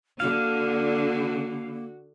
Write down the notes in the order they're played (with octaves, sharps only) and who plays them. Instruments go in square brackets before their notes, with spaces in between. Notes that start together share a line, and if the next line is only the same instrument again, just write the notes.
[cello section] D3 [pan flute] A#3 [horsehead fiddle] F#4 [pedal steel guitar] F5